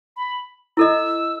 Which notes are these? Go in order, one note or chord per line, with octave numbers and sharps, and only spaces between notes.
B5
E4 A4 D#5 E6